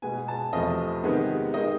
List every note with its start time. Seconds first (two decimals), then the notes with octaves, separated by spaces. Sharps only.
0.02 B2 G#3 B3 G#5
0.28 A5
0.53 E2 C3 F3 A3 D#5
1.04 C3 D#3 G#3 B3
1.54 D#3 G#3 D#5